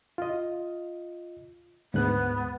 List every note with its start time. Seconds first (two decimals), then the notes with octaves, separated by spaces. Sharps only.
0.18 F4 D#5
1.94 D2 G#2 B3 F#6